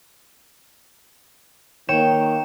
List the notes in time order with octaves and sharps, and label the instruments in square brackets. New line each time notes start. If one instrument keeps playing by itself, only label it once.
[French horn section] D#3 A#3 [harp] C#5 G5 E7